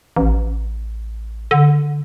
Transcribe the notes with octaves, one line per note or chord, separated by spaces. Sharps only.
A1
D3